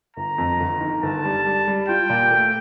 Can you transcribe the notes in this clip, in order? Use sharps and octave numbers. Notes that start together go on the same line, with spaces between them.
G1 A#5
F2
G1
D#3
G1 A5
G3
G3
G3
F4 G5
A#2
A3